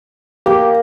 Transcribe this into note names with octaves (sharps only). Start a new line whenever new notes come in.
A#3 G4 A#4